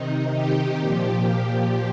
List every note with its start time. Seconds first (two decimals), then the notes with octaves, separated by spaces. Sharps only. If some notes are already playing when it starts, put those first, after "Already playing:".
Already playing: C3 D#3 D#4
0.34 G4
0.80 A#2 F3